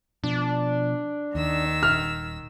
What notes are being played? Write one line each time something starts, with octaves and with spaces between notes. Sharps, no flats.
B2 F3 D4
D#2 D#3 E6
D#1 F6